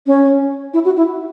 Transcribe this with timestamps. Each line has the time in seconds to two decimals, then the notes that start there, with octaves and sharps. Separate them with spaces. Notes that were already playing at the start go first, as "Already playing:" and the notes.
0.07 C#4
0.74 E4
0.85 F#4
0.97 E4